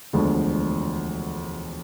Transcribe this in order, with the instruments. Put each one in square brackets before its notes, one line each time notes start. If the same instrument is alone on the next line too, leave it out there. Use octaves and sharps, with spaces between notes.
[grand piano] E1 D2 D3 F3 G#3